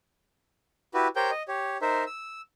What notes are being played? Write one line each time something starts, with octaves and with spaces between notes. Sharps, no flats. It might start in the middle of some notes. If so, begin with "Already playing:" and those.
E4 F#4 G4 B4
G4 A#4 C5 C#5 G5 G6
D#5
G4 C#5
D#4 A#4 C5 E5
E6